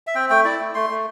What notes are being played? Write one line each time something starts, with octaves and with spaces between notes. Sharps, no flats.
E5
C4 G5
A3 G5
E4 D5
A3
A3 C6
A3